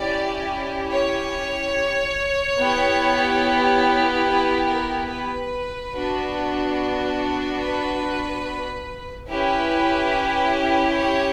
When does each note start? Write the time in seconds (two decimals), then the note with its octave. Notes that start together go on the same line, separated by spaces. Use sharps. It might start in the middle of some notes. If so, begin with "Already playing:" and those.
Already playing: C#4 E4 G4 D5
0.91 C#5
2.58 B3 E4 G4
4.26 B4
4.67 A#4
5.08 B4
5.93 B3 D4 F#4
7.60 B4
9.27 C#4 E4 G4 B4
10.96 C#5